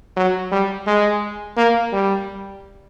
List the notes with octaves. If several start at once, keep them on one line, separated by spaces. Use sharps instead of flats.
F#3
G3
G#3
A#3
G3